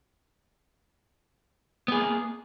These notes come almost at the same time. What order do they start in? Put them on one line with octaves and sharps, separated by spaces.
B3 G#4 A#3